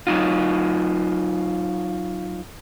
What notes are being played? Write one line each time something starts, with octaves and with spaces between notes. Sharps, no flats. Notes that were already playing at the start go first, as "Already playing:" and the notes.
F#3 D#4 F4